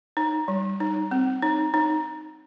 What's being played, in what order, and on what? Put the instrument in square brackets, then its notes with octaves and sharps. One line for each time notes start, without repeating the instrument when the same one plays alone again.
[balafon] D#4
G3
D#4
C4
D#4
D#4